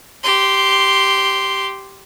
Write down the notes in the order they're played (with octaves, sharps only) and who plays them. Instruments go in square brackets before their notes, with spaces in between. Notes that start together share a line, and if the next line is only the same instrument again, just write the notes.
[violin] G4 C6